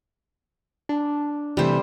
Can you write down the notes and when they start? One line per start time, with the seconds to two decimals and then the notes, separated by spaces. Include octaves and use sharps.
0.89 D4
1.57 C3 E3 G3 A3 C5